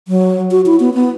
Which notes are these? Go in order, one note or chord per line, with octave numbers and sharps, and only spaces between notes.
F#3
F#4
E4
B3
B3